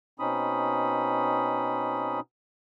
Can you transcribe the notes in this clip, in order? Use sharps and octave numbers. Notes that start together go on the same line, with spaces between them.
B2 C4 C#4 D#4 B5 D#6